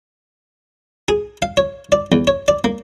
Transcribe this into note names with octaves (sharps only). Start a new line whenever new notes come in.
G#4
F5
C#5
D5
E2
C#5
D5
A#3